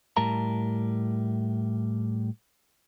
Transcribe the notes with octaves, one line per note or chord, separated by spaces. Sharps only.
A2 G3 A#4 A5 A#5